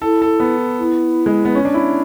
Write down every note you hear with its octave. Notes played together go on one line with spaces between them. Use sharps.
E4 A4
A4
B3
E4
G#3
B3
C#4
D4
E4